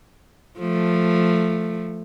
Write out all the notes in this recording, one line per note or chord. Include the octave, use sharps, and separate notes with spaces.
F3 A3